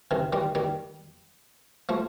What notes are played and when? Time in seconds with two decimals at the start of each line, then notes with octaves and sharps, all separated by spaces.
0.11 C3 D#3
0.33 D#3 G3
0.55 D#3 G3
1.89 F3 A3